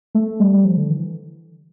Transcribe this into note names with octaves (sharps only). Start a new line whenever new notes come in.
A3
G3
G3
F3
D3
E3